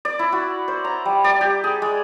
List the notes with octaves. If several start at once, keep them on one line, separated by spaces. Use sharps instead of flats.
D5
E4
F#4
C5
A#5
G3
D5
G4
G#4
G#3